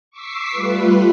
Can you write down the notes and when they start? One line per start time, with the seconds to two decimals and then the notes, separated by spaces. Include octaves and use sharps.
0.11 C#6 D6 E6 B6 C7
0.50 G3 A3 F4 B4